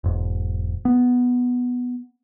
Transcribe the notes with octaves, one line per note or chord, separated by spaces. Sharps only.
E1 G#2
B3